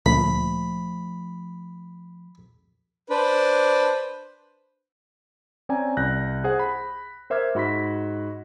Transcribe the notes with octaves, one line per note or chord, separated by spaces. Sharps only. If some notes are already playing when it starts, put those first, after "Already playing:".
D2 A#2 F3 A3 B5
D4 B4 C5
C4 C#4 D5 G5 G#5 A#5
C2 F#6 G6 A#6
G#4 C5 F#5
B5
A#4 C5 E5 D6 F6 G#6
G#2 F#4 B5 C6 A#6 B6